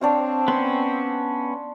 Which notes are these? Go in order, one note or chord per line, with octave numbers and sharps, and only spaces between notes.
C4 D4 C#5 F5
B3 C#4 C6